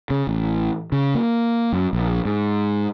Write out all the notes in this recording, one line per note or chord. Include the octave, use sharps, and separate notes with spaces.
C#3
A1
C#3
A#3
F#2
A#1
G#2